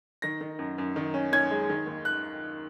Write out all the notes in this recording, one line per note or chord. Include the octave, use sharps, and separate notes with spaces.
D#3 A#6
D#3
F#2
F#2
D#3
C#4
C#4 G#6
G#3
D#3
D#2
F#6